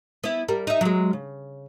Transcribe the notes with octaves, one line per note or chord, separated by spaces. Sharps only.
B3 E4
G3 A#4
D#4 E5
F#3 G#3
C#3